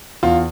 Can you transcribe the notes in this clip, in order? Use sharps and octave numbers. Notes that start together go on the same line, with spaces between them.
E2 F4